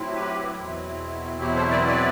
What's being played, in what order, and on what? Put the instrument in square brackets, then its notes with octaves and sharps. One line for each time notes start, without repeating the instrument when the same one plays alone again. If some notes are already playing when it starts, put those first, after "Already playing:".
Already playing: [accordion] A2 F#3 C4 E4
G4 B4
E2 B2 F#3 C4 E4
G4
A4 C5
B4 D5
B4 D5